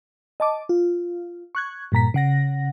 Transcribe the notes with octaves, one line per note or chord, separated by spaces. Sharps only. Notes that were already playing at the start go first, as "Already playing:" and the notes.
D#5 A5 D6
F4
C#6 F#6 G#6
G2 A#2 A#5 B6
C#3 F#5 A#6